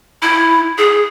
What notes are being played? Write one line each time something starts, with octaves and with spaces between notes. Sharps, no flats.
E4
G#4